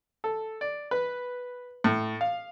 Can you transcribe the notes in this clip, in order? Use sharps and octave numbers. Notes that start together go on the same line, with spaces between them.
A4
D5
B4
A2
F5